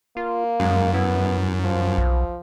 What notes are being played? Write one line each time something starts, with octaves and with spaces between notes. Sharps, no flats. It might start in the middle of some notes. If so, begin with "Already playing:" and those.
A#3 F4
F#2 G#3
B3 E4
F3
B1